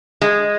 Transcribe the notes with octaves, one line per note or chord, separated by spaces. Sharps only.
G#3